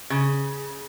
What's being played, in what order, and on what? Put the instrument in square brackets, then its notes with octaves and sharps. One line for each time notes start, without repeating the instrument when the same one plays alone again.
[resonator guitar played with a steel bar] C#3